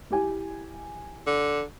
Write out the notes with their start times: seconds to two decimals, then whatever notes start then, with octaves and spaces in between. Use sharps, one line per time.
0.10 E4 G4 G#5
1.27 D3